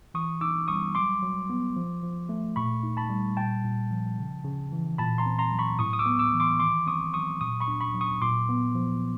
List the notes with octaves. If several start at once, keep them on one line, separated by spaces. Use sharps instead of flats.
E3 C#6 D#6
D#4 D6 E6
G3 C#6 D#6
F#3 C6 D6
F#3
B3
F3
F3
A3
A#2 B5 C#6
D#4
A5 B5
G3
A#2 G5 A5
A#2
F3
C#3
C#3
E3
A#2 A5 B5
A#5 C6
C4
A#5 C6
F#3
B5 C#6
A2 C#6 D#6
D#6
D6 E6
B3
D6 E6
E3
C6 D6
D#3 C6 D6
C4 C#6 D#6
F#3 C#6 D#6
A#2 C#6 D#6
B5 C#6
D4
B5 C#6
F#3
C#6 D#6
A#2 C6 D6
B3
F3